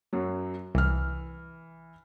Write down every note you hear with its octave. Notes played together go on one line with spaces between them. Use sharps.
F#2 F#3
C2 E3 F6